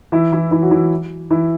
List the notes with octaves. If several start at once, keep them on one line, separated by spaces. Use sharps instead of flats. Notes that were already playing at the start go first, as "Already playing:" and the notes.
E3 E4
E3 E4
E3 E4
F#3 F#4
E3 E4
E3 E4